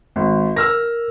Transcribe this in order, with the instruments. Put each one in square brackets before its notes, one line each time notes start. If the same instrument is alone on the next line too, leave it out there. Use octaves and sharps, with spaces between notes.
[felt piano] G#1
[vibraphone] A#4 [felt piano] E6 F6 A#6